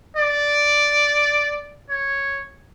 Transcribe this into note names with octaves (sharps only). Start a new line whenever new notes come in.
D5
C#5